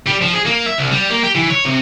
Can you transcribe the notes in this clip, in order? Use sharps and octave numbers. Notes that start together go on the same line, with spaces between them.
G3
F3
G#4
A#3
E5
C2
G3
A#3
G4
E3
C#5
C3